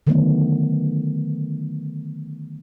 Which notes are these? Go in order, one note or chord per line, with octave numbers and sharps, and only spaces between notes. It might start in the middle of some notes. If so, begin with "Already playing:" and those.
D3 D#3 F#3 A3 B3